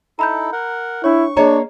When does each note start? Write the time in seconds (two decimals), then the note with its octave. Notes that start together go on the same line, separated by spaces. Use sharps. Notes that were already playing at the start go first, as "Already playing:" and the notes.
0.19 D#4 E4 A4 A#5 B5 G6
0.52 A#4 F#5
1.04 D4 E4 C#5 C#6
1.37 A#3 D4 G#4 C#5 D#5 A#5